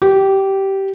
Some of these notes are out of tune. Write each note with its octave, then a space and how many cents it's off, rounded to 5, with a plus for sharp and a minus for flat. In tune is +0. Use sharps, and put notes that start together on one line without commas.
G4 -15